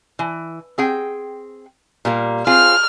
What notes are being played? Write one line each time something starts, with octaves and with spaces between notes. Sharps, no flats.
E3
C4 G#4 G5
A#2 G3 A#3
C4 F4 G#4 F6